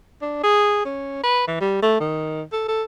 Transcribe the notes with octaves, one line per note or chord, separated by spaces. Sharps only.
D4
G#4
C#4
B4
E3
G3
A3
D#3
A4
A4